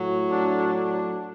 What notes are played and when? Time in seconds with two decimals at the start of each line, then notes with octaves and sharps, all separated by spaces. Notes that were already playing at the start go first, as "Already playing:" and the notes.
Already playing: A2 F#3
0.30 D4
0.74 D4